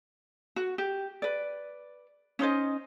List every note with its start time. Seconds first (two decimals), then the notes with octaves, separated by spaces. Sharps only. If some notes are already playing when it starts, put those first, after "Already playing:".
0.56 F#4
0.78 G4
1.22 B4 D5
2.39 C#4 D#4 C5 D#5